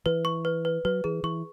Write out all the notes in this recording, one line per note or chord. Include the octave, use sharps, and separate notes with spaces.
E3 B4
C#6
B4
B4
F#3 B4
E3 G#4
E3 C#6